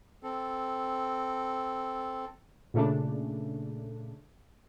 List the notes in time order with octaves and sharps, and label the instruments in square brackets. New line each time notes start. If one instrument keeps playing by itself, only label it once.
[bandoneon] C4 A4
[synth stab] A#2 C#3 A3 D4